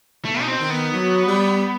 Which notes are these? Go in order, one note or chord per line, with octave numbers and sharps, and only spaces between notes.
B2 A3
D#4
C4
D#3
B3
F#3
G3